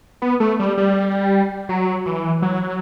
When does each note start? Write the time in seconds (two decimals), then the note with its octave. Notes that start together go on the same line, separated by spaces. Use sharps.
0.22 B3
0.40 A3
0.59 G3
0.78 G3
1.69 F#3
2.06 E3
2.42 F#3